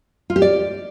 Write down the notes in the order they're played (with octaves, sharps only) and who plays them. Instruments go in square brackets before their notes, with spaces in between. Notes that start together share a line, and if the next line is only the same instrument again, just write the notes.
[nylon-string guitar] F4
G4
D5